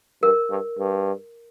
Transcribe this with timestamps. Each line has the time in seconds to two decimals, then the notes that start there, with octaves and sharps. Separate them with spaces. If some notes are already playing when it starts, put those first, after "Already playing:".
0.22 G2 A#4
0.50 G2
0.78 G2